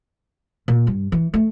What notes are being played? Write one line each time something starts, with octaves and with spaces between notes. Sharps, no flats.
A#2
G2
E3
A3